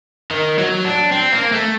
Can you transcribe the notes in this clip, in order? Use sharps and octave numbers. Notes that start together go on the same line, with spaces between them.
D#3
F#3
D4
C4
A#3
A3